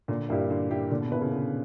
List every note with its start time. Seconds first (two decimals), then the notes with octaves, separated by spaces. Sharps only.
0.08 A#2 D3
0.29 G2 A#3 E4 G4
0.50 D3
0.71 A#3 E4 G4
0.91 A#2 D3
1.01 B2
1.11 B2 A#3 E4 B4
1.21 C#3
1.32 D3